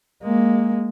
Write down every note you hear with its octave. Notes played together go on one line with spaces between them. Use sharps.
G#3 A#3